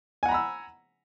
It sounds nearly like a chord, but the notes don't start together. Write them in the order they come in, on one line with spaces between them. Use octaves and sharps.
G#5 F#5 A#5 B5 E6